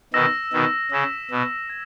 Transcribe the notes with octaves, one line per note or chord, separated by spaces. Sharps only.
B2 D#3 E6 A#6 E7
B2 D#3
C#3 E6 B6 E7
B2
G#6